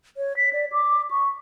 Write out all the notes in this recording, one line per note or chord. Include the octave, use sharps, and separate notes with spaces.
C#5
B6
D5
D6
C#6